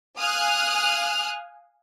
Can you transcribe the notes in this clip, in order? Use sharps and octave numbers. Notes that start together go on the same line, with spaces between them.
F5 G#5 D#6 F6 F#6